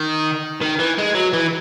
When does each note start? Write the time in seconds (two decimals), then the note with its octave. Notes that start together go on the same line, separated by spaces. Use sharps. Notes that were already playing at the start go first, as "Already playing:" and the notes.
Already playing: D#3
0.61 D#3
0.79 E3
0.98 G#3
1.15 F#3
1.33 E3